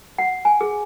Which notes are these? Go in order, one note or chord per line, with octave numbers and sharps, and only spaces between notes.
F#5
G#5
G#4